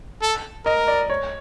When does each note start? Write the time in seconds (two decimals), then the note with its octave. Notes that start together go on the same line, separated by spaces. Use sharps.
0.22 A4
0.65 A#4 D#5
0.88 D5
1.10 C#5